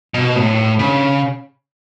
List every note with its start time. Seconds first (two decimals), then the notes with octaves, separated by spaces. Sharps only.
0.14 B2
0.36 A2
0.79 C#3